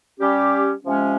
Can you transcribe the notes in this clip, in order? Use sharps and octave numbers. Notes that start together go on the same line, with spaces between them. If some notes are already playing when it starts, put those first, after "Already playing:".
G3 C#4 G4
C3 F3 G#3 C#4